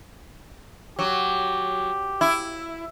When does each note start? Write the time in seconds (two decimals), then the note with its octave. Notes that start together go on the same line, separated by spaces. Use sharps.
0.99 F#3 G4
2.21 E4